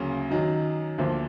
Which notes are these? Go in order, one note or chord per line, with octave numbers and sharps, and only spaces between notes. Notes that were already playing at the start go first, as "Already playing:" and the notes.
Already playing: D2 C#3 F#3 A#3 C#4
F#2 D#3 F#3
D2 D3 F3 A#3 D4